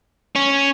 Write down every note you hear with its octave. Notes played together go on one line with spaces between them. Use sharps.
C#4